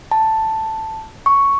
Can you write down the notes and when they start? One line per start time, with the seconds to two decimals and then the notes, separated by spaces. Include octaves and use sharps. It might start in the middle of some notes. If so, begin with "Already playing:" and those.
0.11 A5
1.26 C#6